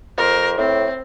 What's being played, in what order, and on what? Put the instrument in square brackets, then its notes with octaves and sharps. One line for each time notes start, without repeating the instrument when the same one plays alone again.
[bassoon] F2 [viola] A#4 C5
[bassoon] A2 [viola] C4